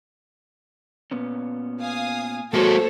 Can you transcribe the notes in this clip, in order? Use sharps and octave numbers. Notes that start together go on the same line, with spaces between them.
A#2 B3 C#4
F5 G#5 D#6
G#2 G#3 A#3 F#4 A4 C5 C#5